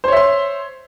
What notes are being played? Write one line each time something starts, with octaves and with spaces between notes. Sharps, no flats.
C5 C#5 E5 C6